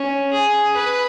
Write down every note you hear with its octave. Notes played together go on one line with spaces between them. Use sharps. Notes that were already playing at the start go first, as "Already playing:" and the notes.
Already playing: C#4
G#4
B4